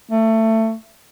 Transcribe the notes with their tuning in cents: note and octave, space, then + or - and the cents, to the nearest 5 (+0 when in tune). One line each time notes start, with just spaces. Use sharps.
A3 +20